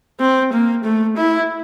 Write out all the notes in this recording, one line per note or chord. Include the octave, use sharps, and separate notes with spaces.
C4
A#3
A3
E4